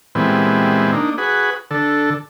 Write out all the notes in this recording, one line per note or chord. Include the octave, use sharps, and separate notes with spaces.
A#2 E3 G3 G#3 B3 C4
A#3 D4 D#4
F#4 G#4 B4
D3 A4